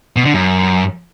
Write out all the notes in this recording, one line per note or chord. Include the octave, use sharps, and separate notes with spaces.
B2
D3
F#2